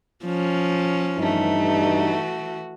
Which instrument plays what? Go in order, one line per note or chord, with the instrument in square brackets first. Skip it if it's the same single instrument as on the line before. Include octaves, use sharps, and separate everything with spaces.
[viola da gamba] F3 C#4
[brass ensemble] G2 D#4 [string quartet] E3 A3
[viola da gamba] F#4